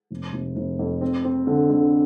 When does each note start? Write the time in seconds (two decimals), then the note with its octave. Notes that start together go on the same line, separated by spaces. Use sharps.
0.10 F1
0.33 F1
0.56 F1
0.79 F2
1.01 C4
1.25 C4
1.47 D3
1.70 D3